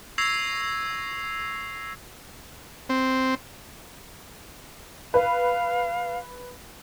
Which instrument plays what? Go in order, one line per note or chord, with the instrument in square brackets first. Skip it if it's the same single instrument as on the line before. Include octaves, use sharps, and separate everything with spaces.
[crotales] C#6 E6 G#6 A#6 C7 F7
[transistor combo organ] C4
[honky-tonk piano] B4 [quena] F5